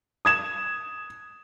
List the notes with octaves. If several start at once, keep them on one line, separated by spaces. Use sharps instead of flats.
D#6 G#6 E7